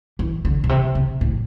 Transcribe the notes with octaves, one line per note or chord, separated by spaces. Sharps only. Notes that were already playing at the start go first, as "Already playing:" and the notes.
E3
D3
B2
C3
C3
A2